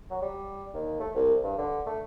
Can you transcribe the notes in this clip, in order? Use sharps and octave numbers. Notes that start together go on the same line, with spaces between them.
F#3
G3
D#2
A3
C2
G2
D3
A3